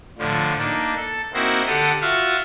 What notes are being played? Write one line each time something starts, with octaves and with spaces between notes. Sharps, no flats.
A2 D3 F3
A#3 D4 D#4
A4
A#3 C4 D#4 E4 F#4 C5
D3 G4 A4 F#5 D#6
F4 F#4 E5 F5